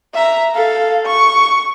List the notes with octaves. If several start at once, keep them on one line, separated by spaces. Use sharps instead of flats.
E5 A#5
A4 F5
C#6